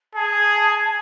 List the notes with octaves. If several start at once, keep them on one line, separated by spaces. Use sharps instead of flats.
G#4 A5